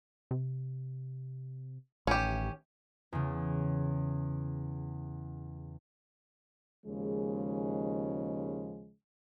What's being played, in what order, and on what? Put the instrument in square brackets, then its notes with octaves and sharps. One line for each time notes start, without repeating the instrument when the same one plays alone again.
[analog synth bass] C3
[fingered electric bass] A1 [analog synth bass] D#3 [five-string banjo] C#4 G4
[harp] E2 C#3
[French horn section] D#2 C#3 F3 G#3